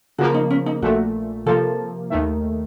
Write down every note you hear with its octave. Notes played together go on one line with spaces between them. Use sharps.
C#3 F3 A#3 F#4
D#4
C#4
D#4
A#1 A#2 A3 F#4
C3 F3 A#3 A4
D#2 D#3 A3